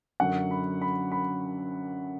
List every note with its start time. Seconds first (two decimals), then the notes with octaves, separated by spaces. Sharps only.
0.20 F#2 D3 F#3 F#5
0.51 B5
0.82 B5
1.12 B5